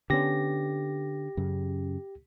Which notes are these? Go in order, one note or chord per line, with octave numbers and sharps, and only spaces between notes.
D3 B3 C#4 G4 A#6
F#2 C#3